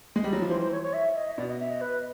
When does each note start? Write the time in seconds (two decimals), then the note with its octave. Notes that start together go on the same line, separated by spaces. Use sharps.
0.16 G#3
0.24 G3
0.33 F#3
0.42 F3
0.49 E3 C5
0.61 C5
0.72 C#5
0.83 C#5
0.93 E5
1.15 D#5
1.37 B2 D5
1.49 D#5
1.60 E5
1.70 D#5
1.81 B4